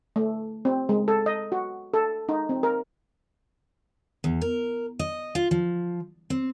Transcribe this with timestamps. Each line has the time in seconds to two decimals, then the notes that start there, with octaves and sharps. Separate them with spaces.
0.16 A3
0.65 C4
0.89 G#3
1.08 A4
1.26 D#5
1.52 F#4
1.94 A4
2.29 D#4
2.49 C4
2.63 A#4
4.24 E2
4.41 A#4
4.99 D#5
5.35 F4
5.51 F3
6.30 C4